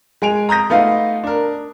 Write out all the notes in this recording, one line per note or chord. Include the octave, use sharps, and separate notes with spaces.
G#3 G#5 D7 F7
A#5 D#6 G6 A#6
A3 B3 D#4 F4 F5
D4 A#4